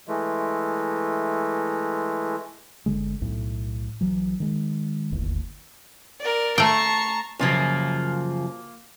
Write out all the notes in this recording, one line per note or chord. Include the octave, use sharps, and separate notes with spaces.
E3 G#3 A3
G1 D2 D3 G#3
B1 A2
A#1 E3 F#3
D#3 G#3
D1 G1 D#2
A#4 D5
A3 G5 A5 A#5 C#6 C7
F#2 C#3 F3 A#3 F4